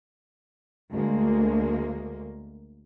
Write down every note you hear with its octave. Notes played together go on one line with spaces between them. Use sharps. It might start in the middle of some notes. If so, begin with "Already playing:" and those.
D2 G#3 A#3